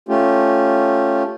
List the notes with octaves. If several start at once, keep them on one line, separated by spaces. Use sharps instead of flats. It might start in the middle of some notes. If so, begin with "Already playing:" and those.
A3 C#4 F4 G4